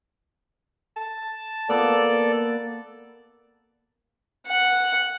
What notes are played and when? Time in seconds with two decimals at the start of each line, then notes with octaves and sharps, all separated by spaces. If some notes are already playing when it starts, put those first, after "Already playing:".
0.96 A5
1.69 A#3 B3 A4 D5
4.47 F#5